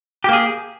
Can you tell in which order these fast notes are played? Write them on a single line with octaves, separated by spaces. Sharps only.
G4 A#3 G#4